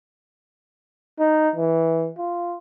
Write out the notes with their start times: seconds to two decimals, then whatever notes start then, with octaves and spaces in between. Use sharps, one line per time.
1.19 D#4
1.56 E3
2.18 F4